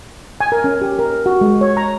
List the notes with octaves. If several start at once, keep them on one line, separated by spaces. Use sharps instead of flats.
G#5
A#4
C#4
G4
A#4
F#4
G#3
C#5
A#5